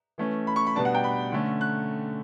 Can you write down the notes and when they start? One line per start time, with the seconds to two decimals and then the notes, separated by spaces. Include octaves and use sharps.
0.18 E3 A3 C#4
0.47 B5
0.56 C#6
0.67 B5
0.75 B2 G3 B3 D4 A5
0.85 F#5
0.95 G5
1.04 B5
1.32 D3 A3 C#4
1.61 F#6